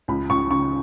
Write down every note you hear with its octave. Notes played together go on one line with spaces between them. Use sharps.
C#2 B5
C#2 C#6
C#3 C#6